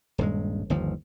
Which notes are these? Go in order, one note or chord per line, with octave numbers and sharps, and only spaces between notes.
D#1 G2 G#3
G1 D#2 F3